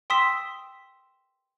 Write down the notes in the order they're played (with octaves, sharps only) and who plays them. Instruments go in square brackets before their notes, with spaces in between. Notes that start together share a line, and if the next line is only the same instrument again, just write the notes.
[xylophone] G5 C6 D#6 E6 B6 E7